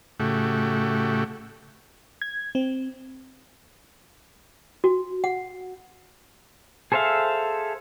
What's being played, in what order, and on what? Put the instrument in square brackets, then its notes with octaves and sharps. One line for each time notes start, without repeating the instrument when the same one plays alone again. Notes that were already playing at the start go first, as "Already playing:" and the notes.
[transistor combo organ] A2 C#3 A3 F#4 G4
[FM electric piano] G#6
C4
[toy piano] F#4
F#5
[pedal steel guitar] G#4 A4 C5 E5 F5